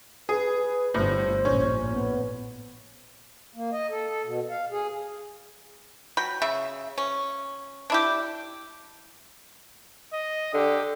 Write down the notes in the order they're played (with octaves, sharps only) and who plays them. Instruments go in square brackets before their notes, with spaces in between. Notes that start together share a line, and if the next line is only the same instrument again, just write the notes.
[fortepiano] G#4 [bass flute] B4
[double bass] G1 [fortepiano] A2 [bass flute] C5
[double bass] A#1 A2 [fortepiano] C#4
[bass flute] B3
[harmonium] A#3
D#5
A4
A4
B2
F5
G#4
[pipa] F#3 G5 B5
C#3 E5
C#4
D4 E4 G4
[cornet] D#5
[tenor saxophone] D3 [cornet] G4